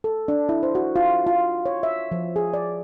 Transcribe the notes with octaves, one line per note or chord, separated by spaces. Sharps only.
A4
D4
E4
C5
F#4
F4
F4
C#5
E5
F3
G#4
D5